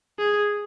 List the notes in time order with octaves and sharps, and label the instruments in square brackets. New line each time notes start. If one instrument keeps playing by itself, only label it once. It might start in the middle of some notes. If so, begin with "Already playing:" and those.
[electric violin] G#4